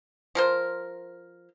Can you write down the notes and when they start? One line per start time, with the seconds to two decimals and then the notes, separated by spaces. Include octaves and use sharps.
0.35 F3 A#4 C5